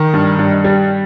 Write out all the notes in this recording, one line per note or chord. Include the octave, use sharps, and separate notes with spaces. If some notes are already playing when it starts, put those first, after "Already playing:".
Already playing: D#3
G2
G2
G3